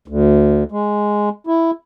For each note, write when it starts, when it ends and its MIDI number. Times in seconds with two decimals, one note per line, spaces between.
0.08 0.64 38
0.72 1.29 56
1.47 1.71 64